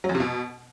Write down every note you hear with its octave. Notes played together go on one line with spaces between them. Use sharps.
F#3
F2
C3
B2